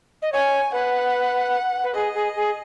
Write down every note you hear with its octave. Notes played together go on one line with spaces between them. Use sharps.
D#5
C#5 G#5
B4 F#5
B4
G#4 D#5
G#4
G#4